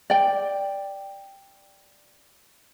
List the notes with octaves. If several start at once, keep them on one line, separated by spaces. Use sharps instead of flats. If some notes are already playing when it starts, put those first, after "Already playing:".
D5 G5